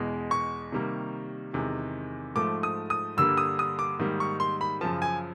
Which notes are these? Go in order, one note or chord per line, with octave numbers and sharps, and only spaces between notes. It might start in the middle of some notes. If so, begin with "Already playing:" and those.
Already playing: E2 B2 G#3
C#6
C3 D#3 G3 A#3
E2 C3 D#3 G#3
G#2 F3 A3 D6
D#6
D#6
G2 D3 G3 A#3 E6
D#6
D#6
D6
G#2 D#3 G3 A#3
C#6
C6
B5
F#2 C#3 F3 A5
G#5